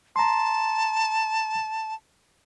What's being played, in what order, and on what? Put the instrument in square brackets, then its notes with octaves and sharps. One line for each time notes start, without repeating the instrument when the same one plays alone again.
[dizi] A5 [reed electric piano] A#5 C6